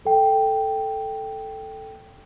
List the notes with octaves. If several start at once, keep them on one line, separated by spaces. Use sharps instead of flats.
A4 G5